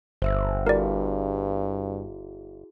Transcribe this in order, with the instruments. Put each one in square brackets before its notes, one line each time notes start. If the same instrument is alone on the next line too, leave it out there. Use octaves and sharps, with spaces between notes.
[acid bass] G1 [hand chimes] C5 E5 E6
[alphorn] G2 [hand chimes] E4 F#4 G#4 [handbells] A#4 D5